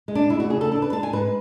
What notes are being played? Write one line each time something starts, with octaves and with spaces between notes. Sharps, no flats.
G#3
D4
D2 E4
F#4
C#3 G#4
A4
D4 A4
B4
G#3 A5
G#5
G#2 B4